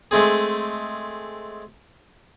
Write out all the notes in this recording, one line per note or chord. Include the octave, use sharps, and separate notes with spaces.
G#3 A3 C4 G#4